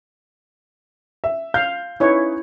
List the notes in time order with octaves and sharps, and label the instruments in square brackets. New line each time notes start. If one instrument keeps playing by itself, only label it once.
[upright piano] E5
[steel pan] F5 [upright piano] G6
[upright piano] C#4 D#4 B4 [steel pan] E4 C#5